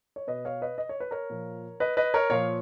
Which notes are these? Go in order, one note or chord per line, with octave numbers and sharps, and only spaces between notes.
C#5
B2 B4 D#5
C#5 F5
B4 D#5
D#5
C#5
B4
A#4 C#5
A#2 F3
B4 D#5
B4 D#5
A#4 C#5
A#2 F3 C#5 F5